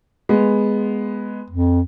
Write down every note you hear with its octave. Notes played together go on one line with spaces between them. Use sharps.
G#3 B3
F2